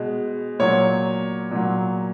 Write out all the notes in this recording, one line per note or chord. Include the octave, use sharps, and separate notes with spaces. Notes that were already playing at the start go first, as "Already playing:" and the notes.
Already playing: B2 G#3
A#2 F#3 C#5
A#2 F#3